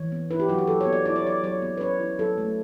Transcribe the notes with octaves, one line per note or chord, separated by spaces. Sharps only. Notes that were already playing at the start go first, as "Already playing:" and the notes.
Already playing: E3 C#5
B3
E4 B4
G4
F#3 F#4
G4
F#3 A4
C#5
B3
D5
E4 D5
C#5
F#3 D5
F#3 C#5
B3
B4
C#4 C#5
E4
F#3 A4
A3